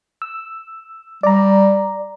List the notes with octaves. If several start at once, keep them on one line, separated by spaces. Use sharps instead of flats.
E6
G3 D5 A#5